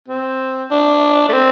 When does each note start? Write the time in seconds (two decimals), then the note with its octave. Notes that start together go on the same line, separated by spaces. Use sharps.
0.08 C4
0.71 D4
1.28 A3
1.33 C4